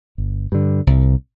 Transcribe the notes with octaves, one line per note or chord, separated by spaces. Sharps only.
G1
G2 D3
C2